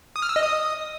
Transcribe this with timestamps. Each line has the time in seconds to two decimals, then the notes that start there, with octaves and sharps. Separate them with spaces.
0.16 D#6
0.22 F6
0.29 E6
0.36 D#5
0.43 D#6